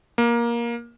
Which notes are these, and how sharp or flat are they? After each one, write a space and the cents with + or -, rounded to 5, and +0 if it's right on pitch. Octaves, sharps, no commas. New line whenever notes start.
A#3 +15